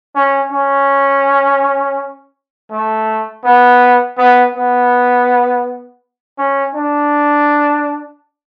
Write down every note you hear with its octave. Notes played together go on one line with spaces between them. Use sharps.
C#4
C#4
A3
B3
B3
B3
C#4
D4